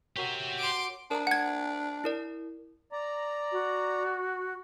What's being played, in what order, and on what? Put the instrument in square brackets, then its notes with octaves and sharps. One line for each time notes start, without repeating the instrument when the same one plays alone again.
[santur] F#4 A#4 C#5 [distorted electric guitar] G4 E5
[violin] C6 D6
[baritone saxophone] D4 [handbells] A#4 A#5
[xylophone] F#5 G#6
[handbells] E4 A#4 D5
[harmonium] D5 A#5
[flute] F#4